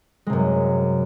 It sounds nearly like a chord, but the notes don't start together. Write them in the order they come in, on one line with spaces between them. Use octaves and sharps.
G#3 C3 F#2